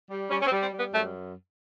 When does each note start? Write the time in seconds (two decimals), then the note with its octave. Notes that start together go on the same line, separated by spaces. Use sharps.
0.10 G3
0.30 G3 C#4
0.42 C#4
0.47 C4
0.51 G3
0.62 C4
0.73 G3
0.78 B3
0.93 F#2 A3